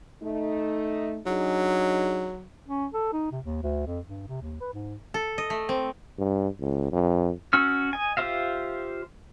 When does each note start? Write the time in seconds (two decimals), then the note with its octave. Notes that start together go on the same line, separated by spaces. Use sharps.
0.22 A3 D#4
1.26 F#3 D4 D#4 G#4
2.66 C#4
2.94 A4
3.12 D#4
3.31 C3
3.45 D#2
3.63 D2
3.87 F2
4.07 G2
4.28 C3
4.41 D#2
4.61 B4
4.73 G#2
5.14 A4
5.38 D#5
5.50 A3
5.69 C4
6.19 G2
6.60 C#2
6.92 F2
7.53 C#4 F#4 E6 F6
7.93 D#5 G#5
8.17 F4 G4 C5 E5 F5